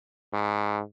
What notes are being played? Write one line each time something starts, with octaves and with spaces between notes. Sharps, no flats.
G#2